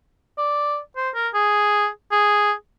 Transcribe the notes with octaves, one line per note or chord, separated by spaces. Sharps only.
D5
C5
A#4
G#4
G#4